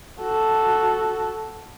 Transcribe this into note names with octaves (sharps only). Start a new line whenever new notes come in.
F#4 A4